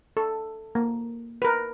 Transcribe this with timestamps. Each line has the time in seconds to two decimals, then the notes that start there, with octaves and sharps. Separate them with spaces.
0.17 A4
0.75 A#3
1.42 A#4 B4